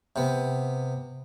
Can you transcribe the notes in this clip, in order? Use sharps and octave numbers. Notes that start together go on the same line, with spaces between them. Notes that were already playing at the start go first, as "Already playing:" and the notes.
C3 B3